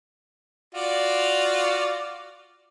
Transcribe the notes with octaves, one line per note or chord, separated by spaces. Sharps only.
F4 F#4 D5